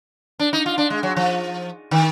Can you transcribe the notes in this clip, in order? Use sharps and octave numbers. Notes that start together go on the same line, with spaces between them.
D4
D#4
F4
D4
G#3
F#3
F3
D#3